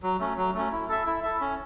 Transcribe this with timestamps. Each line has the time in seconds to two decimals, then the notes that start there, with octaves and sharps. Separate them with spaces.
0.03 F#3
0.20 A3 C#4
0.37 F#3
0.55 A3 C#4
0.72 E4
0.89 A4 E5
1.06 E4
1.23 A4 E5
1.41 C#4